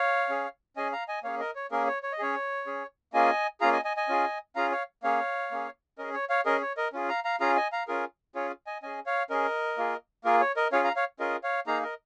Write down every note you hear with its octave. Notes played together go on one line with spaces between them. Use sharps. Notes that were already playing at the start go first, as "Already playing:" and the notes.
Already playing: C#5 F5
C#4 G#4
C#4 G#4 D#5 G#5
F5 A#5
D#5 G#5
A#3 C#4 G#4 C#5 F5
A#4 D#5
C#5
A#3 C#4 G#4 A#4
C#5
C#5
D#5
C#4 G#4 C#5
C#4 G#4
A#3 C#4 F4 G#4 D#5 G#5
A#3 C#4 F4 G#4 F5 A#5
D#5 G#5
D#5 G#5
D#5 G#5
C#4 F4 G#4
C#4 F4 G#4 F5 A#5
C#5 F5
A#3 C#4 G#4 C#5 F5
A#3 C#4 G#4
C#4 G#4 A#4 D#5
C#5
C#5 F5
C#4 G#4 A#4 D#5
C#5
A#4 D#5
C#4 F4 G#4
F5 A#5
F5 A#5
C#4 F4 G#4 F5 A#5
D#5 G#5
F5 A#5
C#4 F4 G#4 A#4
C#4 F4 G#4 C#5
D#5 G#5
C#4 G#4 D#5 G#5
C#5 F5
C#4 G#4 A#4 D#5
A#3 F4 G#4
A#3 F4 G#4 A#4
C#5
A#4 D#5
C#4 F4 G#4 C#5 F5
F5 A#5
C#5 F5
C#4 F4 G#4 A#4 D#5
C#5 F5
A#3 D#4 G#4 F5 A#5
A#4 D#5